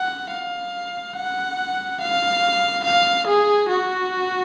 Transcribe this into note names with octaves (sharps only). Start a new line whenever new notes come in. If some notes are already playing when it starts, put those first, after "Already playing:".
Already playing: F#5
F5
F#5
F5
F5
G#4
F#4